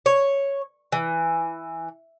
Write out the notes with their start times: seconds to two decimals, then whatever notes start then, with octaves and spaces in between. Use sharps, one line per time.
0.06 C#5
0.92 E3